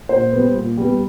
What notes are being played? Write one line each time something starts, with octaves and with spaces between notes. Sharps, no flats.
A#2 C5
G3 B3
A#2
G3 B3